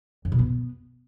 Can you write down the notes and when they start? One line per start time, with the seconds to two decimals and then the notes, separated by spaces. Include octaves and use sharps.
0.25 F#2
0.32 B2
0.39 B3